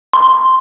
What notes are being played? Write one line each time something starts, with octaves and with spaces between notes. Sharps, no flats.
C6